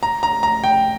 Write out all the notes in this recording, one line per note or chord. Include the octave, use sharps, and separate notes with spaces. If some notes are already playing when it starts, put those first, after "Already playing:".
A#5
A#5
A#5
G5